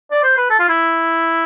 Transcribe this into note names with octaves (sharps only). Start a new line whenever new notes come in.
D5
C5
B4
A4
F4
E4